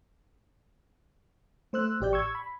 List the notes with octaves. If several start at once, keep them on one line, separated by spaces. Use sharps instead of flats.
A3 C5 E6 F#6
A1 G4 D5 G6
C#6 E6 G#6
B5